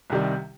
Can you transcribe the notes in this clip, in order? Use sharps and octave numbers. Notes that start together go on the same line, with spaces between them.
C2 C3 D#3 G3